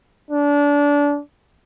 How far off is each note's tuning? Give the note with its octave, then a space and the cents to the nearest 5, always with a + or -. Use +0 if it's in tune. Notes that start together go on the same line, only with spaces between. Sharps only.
D4 -25